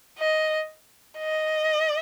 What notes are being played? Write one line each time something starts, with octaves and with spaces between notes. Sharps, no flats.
D#5
D#5